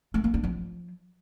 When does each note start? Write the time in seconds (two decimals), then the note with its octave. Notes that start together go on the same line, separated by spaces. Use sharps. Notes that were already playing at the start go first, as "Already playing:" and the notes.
0.14 A3
0.24 A#3
0.34 D4
0.44 F3